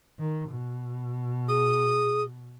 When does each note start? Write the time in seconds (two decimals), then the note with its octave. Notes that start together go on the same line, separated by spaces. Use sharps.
0.19 D#3
0.50 B2
1.49 G#4 D#6